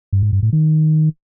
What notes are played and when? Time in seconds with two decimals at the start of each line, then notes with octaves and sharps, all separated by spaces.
0.13 G2
0.23 G#2
0.33 G2
0.43 A2
0.53 D#3